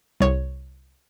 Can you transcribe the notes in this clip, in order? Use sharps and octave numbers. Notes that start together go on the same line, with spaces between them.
C2 C#5